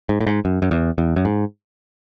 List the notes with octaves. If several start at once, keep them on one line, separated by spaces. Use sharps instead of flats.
G#2
A2
G#2
F#2
F#2
E2
E2
F#2
G#2